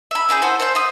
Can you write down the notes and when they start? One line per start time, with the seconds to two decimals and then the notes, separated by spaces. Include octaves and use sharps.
0.11 E5 B5
0.29 C#4 E4 G#4 G6
0.42 E4 F#4 A4 C5
0.60 C5 E5 F#6 G6
0.75 E5 D#6